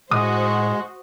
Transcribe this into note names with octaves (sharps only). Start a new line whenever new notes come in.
A2 G#3 F#4 C5 D#6